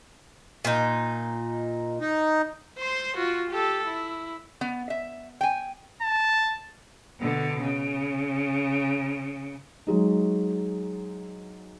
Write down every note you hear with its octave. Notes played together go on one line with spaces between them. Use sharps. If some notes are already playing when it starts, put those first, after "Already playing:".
A#2 D#4
D#4
C5 C6
F4 F#4
G4 A4
E4
B3
E5
G5 G#5
A5
B2 D3
C#3
F#3 G#3 D#4